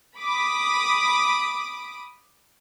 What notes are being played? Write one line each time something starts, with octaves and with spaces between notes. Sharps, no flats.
B5 D6 D#6